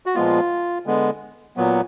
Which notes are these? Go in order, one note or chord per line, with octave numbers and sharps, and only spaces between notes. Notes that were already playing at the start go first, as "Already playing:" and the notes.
F#4
A#2 F3 G#3 B3 F4
D3 G#3 B3
A#2 F#3 B3